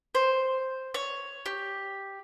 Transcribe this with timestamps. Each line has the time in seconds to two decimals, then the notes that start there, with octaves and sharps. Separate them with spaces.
0.15 C5
0.94 C#5
1.46 G4